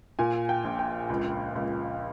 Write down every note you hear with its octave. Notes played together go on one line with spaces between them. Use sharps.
A#2 G#5
G5
A#1
G5
C#2
C#2